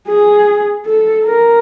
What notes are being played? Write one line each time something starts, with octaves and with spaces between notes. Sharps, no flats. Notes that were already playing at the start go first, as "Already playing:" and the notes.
G#4
A4
A#4